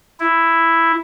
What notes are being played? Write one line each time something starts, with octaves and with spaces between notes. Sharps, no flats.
E4